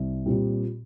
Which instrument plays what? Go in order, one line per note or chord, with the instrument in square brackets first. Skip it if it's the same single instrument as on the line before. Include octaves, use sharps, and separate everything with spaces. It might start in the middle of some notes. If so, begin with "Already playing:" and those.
Already playing: [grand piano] C2
A#2 G3 C4 G4